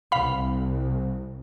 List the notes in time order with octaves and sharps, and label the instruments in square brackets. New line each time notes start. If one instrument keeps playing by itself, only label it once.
[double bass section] C2 [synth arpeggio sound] F5 B5